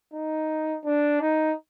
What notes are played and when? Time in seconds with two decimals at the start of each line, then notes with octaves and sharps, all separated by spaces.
0.13 D#4
0.85 D4
1.21 D#4